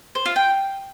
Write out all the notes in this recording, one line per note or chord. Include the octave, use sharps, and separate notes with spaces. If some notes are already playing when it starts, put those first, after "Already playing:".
C5
F4
G5